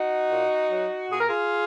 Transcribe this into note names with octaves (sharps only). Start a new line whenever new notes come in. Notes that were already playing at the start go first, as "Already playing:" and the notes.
Already playing: D#4 F#4
A#2
F#3
A#2 G#4
A#4
F4 G#4